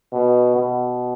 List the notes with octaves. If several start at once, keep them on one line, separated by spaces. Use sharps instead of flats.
B2
B2